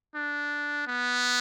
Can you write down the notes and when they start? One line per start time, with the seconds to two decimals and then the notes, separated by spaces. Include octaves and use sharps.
0.15 D4
0.87 B3